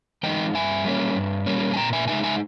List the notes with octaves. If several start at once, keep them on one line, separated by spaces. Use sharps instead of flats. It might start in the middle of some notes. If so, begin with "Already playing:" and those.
E3 G#3 D#4 D#5 G5
G2 E5 G#5
G3 A#3 C#4
G2
G3 A#3 C#4
G#5
A#2 G5 A#5
E5 G#5
G#3 D#4 E5 G#5
E5 G#5